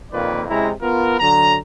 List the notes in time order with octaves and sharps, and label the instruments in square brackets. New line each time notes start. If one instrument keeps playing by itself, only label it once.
[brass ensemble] F2 A#2 D#3 A#3 B4 D5
C3 G#3 C#4 E4 A#5
B3 F4 A#4
D3 F#3 A#5